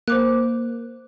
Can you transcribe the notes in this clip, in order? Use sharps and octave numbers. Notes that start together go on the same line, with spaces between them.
A#3 C5 D6 F#6